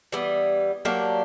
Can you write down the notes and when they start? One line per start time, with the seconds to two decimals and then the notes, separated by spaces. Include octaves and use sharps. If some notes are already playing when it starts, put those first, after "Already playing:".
0.12 E3 G3 B3
0.85 F#3 A#3 D4 G4